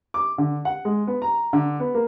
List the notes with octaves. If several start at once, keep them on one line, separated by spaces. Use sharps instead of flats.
D6
D3
F#5
G#3
B3
A#5
D3
B3
A#3